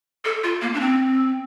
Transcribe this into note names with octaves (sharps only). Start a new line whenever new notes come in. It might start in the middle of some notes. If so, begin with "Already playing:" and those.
A4
F4
A#3
D4
C4